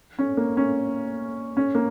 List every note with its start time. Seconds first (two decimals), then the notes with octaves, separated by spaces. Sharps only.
0.19 C#4
0.37 A#3
0.57 C#4
1.57 C#4
1.75 A#3